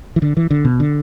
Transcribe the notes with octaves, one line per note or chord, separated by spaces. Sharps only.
E3
D3
E3
D3
B2
D3